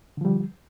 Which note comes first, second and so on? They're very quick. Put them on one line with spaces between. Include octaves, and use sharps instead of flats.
D3 F3 G3